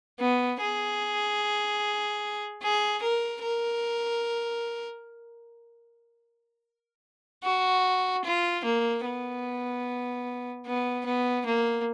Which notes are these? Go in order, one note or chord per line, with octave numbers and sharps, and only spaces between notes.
B3
G#4
G#4
A#4
A#4
F#4
F4
A#3
B3
B3
B3
A#3